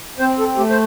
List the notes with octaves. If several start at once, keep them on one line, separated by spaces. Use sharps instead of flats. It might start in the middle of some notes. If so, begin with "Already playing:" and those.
C4 C5
A4
A3 G4
C5